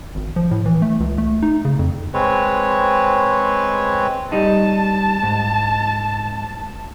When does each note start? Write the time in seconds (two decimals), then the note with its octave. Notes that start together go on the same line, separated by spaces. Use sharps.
0.15 G#1
0.36 F3
0.51 A2
0.66 E3
0.82 A3
1.00 C#2
1.18 A3
1.42 D#4
1.65 C#3
1.79 F2
2.14 G#3 C4 B4 C#5
4.32 G3 D#4 A5
5.23 G#2